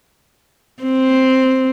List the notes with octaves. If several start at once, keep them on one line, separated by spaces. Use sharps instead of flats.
C4